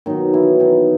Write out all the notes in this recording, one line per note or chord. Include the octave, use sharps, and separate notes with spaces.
B2 D#3 F#3 D#4
E3 E4
D#3 D#4